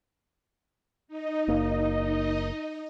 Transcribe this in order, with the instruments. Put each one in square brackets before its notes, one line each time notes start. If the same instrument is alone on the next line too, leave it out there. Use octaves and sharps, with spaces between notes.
[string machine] D#4 D#5
[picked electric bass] F#1 A#3